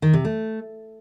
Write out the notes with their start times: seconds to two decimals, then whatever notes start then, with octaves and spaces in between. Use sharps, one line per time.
0.02 D#3
0.13 C3
0.25 A3